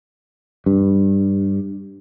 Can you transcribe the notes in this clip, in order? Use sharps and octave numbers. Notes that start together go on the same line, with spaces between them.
G2